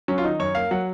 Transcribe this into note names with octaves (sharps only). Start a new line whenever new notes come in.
F#3 C#4
F4
D#3 D#4
F#2 C#5
A#3 F5
F#3 F#5